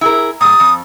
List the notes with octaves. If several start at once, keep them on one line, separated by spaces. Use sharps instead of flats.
E4 G#4 A#4
A#2 G3 D#6
F2